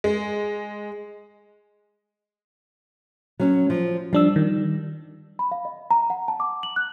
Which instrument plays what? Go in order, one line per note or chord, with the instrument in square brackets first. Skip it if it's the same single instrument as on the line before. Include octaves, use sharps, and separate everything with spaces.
[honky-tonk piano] G#3
[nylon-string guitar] F#3 C#4
F3
[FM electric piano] F3 D4 E6 [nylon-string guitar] G3
[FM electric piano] D#3
[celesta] B5
F5
D#5
A#5
F#5
A5
D6
F#7
F#6